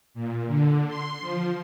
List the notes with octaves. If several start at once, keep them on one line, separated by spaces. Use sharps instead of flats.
A#2
D3
C6
F3